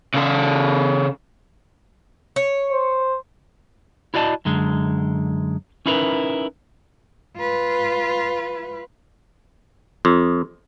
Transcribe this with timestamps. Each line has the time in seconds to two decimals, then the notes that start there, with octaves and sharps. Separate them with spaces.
0.15 C#3 A4
2.36 C#5
2.72 C5
4.14 E4 F#4 D5 D#5 A5
4.45 F#2 D3 G#3
5.86 C#4 D#4 E4 G4 A#4 B4
7.37 F4 B4
10.05 F2